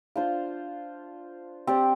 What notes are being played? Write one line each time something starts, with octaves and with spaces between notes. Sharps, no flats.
D4 F4 C5 F5
C4 G4 D5